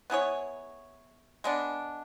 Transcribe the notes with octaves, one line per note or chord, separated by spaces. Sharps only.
B3 E4 G#4 C#5
G#3 B3 D4